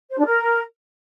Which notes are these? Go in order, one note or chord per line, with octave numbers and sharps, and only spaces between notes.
C5
D4
A#4